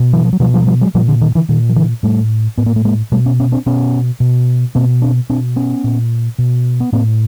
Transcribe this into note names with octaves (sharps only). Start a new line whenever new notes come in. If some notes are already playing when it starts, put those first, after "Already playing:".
Already playing: B2
E3 F#3
F3
F#3
B2 F3 G3
F3 G3
F#3
F3 G3
F#3 G#3
A#2 F3 G3
D3
D#3
D3 E3
A#2 D#3
F3
D3 E3
A2 G3 A3
A2 B3
A#3
A3
G#3 A#3
B2 G3 A3
B3 C#4
B3 C#4
C4 D4
B2 B3 C#4
B2
B2 A#3 C4
C4 D4
B2 C4 D4
B3 C#4
A#2
B2
B3
A2 A#3 C4